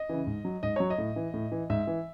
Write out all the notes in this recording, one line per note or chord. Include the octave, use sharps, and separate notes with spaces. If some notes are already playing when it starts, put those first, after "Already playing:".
Already playing: D#5
C#3 E3
G#2
F#3
G#2 D#5
F#3 C#5
D#5
A2
E3
A2
E3
G#2 E5
E3